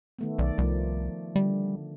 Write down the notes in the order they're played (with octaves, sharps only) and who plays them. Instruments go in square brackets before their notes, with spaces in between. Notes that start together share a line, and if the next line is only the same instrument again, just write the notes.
[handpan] D#3 A3 B3
[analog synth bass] B1 [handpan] D#3 D5
[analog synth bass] C2 [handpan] F3 A3 D5
[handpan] D3 [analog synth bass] G3